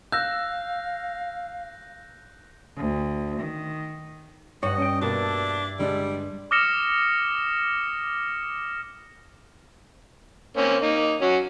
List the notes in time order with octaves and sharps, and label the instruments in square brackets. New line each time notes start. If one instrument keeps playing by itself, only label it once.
[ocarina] F5 [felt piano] E6 [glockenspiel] F#6 [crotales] G6 A#6
[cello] D2
D#3
[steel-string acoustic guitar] G2 [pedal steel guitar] C#5 F#5 [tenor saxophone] D#5
[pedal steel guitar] C#4 G5
[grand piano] B2 A#3 [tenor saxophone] D4 [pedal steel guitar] E4 A5 D6
[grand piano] D3 G#3 D4 [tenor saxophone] G3
[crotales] D6 D#6 F6 A#6 C#7 E7
[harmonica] A#3 C4 C#4
A#3 D#4
F#3 C#4 F#4